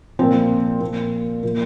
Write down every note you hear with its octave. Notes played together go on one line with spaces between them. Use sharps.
A#2 F3 C4
A#2 F3
A#2 F3 A#3